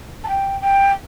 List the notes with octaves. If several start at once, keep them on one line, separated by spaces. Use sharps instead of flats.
A5
G5
G5